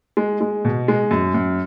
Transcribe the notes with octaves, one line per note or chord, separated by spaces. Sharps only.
G#3
G#3
B2
G#3
F#2
F#2